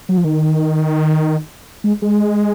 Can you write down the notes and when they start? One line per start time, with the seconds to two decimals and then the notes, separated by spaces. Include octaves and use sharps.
0.09 F#3
0.17 F3
0.24 D#3
1.84 G#3
2.02 G#3